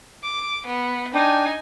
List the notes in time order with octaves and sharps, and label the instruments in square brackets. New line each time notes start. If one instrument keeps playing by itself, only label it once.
[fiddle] D6
B3
[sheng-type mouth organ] D4 G5 [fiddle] D#4 G#5